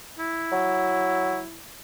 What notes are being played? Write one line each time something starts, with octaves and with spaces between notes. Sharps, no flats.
E4
F#3